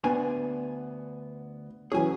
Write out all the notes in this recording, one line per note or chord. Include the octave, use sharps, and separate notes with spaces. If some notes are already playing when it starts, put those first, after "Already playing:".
D2 B3 D4 G#5
E3 F#3 C#4 G#4 G#5